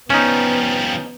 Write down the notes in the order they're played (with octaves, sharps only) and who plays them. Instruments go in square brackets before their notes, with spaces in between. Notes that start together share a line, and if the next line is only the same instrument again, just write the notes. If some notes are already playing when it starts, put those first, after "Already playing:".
[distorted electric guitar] F3 G3 [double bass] B3 [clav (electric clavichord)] C#4 D#4